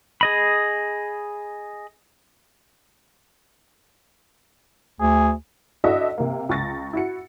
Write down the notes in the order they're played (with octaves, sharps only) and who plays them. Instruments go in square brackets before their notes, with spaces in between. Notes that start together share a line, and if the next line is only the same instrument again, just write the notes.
[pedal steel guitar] G#4 D#5 B5
[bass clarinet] D2 [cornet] G#4
[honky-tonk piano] D4 E4 F#4 A4 D#5 E5
C3 A#3
C#2 C#6 A6 A#6
E4 F#4 C#7